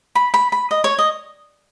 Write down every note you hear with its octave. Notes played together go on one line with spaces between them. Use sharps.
B5
B5
B5
D#5
C#5
D#5